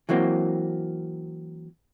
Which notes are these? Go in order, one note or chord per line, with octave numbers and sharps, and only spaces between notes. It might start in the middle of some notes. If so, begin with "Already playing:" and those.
E3 F#3 A#3 C4